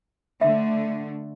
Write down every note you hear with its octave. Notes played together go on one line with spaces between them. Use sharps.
D3 A3 E5